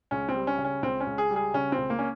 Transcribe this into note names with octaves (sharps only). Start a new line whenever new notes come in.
C#2 C#4
C4
G3
C#4
C#3
C#4
C#2 C4
C#4
C#2
G#4
G3
G#4
C#3 C#4
C4
C#2
A#3
C#4